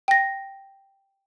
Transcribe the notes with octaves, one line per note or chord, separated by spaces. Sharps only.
G5 A#6